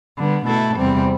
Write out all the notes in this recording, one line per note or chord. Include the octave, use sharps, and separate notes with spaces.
D3 G3 B3
B2 A3 E4 A4
E2 C3 G3 C4